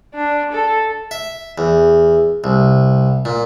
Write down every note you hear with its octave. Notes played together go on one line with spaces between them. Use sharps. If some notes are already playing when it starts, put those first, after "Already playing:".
D4
A4
E5
E2
C2
A#2